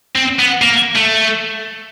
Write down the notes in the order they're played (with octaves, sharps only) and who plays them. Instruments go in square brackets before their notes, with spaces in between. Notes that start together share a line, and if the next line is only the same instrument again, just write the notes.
[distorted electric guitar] C4
B3
A#3
A3